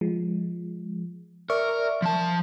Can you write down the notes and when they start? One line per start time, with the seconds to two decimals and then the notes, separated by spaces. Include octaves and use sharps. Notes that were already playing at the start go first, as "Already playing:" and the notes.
0.01 F3 G#3
1.50 A#4 D5 E5 C#6
2.02 F3 A5